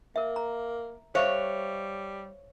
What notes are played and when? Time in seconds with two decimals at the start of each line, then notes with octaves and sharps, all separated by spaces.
0.16 A#3 A#4 E5
0.36 A#5
1.15 G3 C5 C#5 E5 F5